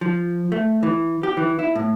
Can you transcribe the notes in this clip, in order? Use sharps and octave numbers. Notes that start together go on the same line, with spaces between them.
F3
A3
E3
G4
E3
E4
A2